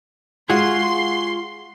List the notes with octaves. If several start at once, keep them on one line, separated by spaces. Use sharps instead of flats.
G#3 F4 F#4 G#4 C6